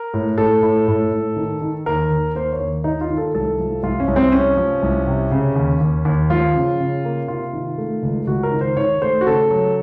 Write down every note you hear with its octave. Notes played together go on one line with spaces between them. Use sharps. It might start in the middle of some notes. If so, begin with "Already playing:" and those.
Already playing: A#4
A2
A2 A4
A2
A2
A2
D#3
D#3
D#2 A#4
D#2
A#3 C5
C#5
D#2
D#3 D#4
F4
D#3
A4
C2 A4
F3
C2 F4
C#4
C2
C4
C3 C#4
F3
C2
C3
C#3
D#2
D#2
D#2
F3 F4
C#3
C#3
A#3
C3 F4
D#3
A3
C#2
C#2 F#4
A#4
D#3
C5
D#3 C#5
A3 C5
F#4
C#3 A4
F#3